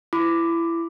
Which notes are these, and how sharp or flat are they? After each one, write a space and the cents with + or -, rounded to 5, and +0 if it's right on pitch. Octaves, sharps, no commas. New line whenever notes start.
E4 +20 B5 +25 D6 +5